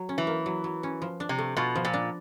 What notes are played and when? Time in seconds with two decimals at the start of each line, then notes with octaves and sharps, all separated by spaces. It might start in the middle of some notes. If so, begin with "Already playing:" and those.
Already playing: F#3
0.09 C#4
0.18 E3
0.27 A#3
0.46 F#3
0.64 F#3
0.83 C#4
1.02 F3
1.20 D4
1.29 C3
1.38 A3
1.57 B2 F4
1.75 F3
1.85 A#2
1.94 D4